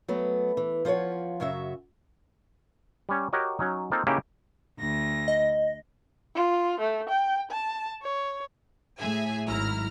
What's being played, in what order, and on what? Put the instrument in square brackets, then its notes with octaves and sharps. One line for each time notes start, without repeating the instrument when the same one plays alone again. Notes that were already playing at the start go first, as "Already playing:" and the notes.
[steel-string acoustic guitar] F#3 A3 B3
E3
F3 F4 C5 C#5 F#5
F#2 C#3 F#3 F#4 E5
[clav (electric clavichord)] G3 C#4
F#4 G4 A#4 C#5 D#5
F#3 C#4 D#4
A#3 C4 D#4 F4 A4
C#3 A#3 C#4 D#4 E4 G4
[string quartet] D2 A#6
[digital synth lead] D#5
[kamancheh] F4
A3
G5
A5
C#5
[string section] A2 G#4 E5 G#5
G#1 F#3 E4 A#5 F6